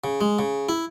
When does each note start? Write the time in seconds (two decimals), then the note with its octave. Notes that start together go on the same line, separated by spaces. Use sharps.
0.04 C#3
0.21 G#3
0.39 C#3
0.69 E4